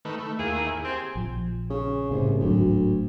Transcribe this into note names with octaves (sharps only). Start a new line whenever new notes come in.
D#3 A3 B4
A3
D#2 A#3 E4 G#4
C4 G4 G#5
A#1 F3
C#3
C2 A2 C#3
D1 G#1 D2 F#3